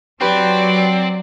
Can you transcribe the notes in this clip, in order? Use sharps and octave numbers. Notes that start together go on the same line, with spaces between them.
F#3 C4 G4 B4 D5